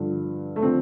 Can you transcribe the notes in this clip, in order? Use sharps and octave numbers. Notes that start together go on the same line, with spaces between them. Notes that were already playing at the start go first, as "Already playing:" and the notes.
Already playing: G2 D3 F3
A3
D3 F3 C4